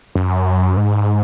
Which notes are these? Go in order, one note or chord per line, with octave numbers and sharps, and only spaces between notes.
F#2
G#2